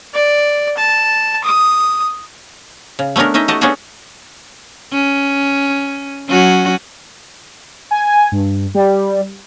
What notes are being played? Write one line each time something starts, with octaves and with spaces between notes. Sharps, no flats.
D5
A5
D#6
C#3
A3 B3 C#4 D4 A#4
C#4 D#4 D#5 E5
A3 F#4 G4 D#5 A5
B3 C#4 D4 F#4 G#4 A4
C#4
F#3 C#4 F#4
G#5
G2
G3